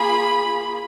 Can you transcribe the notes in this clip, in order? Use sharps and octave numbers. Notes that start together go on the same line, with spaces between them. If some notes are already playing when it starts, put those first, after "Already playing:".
Already playing: A#3 F4 G#4 B5